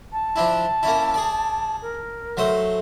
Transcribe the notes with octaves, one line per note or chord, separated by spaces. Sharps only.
A5
F3 D4 E4
A#3 C#4 E4
G#4 D5
A#4
F#3 A3 C5